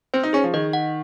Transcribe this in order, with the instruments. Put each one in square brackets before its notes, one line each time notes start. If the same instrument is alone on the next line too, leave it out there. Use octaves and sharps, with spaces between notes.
[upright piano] C4 [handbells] C5
[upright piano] D#4
[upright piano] C#4 [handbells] G#4
[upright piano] F3
[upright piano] D#3 [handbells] D#5
[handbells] F#5